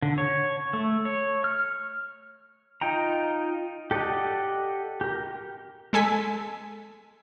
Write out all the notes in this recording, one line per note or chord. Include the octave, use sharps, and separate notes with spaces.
D3
C#5
A3
C#5
F6
D#4 F4 G5 A#5
G4 A4 D5 D#5 F#5
G4 A#4
G#3 A4 G#5 B6